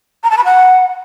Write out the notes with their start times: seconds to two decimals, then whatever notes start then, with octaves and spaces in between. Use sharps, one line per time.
0.23 A#5
0.31 A5
0.38 B5
0.45 F#5